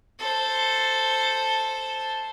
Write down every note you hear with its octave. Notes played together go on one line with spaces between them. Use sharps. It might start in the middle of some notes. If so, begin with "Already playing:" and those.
A4 C5